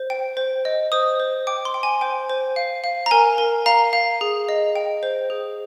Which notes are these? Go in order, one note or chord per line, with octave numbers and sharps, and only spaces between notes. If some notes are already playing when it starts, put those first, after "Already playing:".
Already playing: C5
G5
C5
D#5
C5 D#6
C5
G5 D6
C6
G5
G#5
C5 G5
C5
F5
F5
A#5
A#4 G#5
A#4
F5 A#5
F5
G#4
D#5
G5
C5
G#4